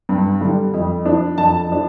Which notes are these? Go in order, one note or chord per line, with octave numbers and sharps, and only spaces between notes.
G2
D3 G3
F2
F3 D4
F2 A5
F3 D4